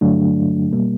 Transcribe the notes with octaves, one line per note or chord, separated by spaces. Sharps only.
G2 D3 F#3 A3 D4
B2 G3 A#3